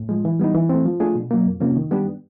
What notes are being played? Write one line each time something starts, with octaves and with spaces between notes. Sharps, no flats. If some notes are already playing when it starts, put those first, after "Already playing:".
Already playing: A2
F3 G#3
E3
G3 B3 D#4
E3
A3 C4
F3
A3 D4 F4 G#4
B2
F#3 A#3
F2
C3 F3 A#3 C#4
D#3
G3 B3 D4 G4